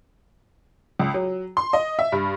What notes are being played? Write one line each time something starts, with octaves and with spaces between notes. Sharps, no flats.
C#2
F#3
C6
D#5
E5
G2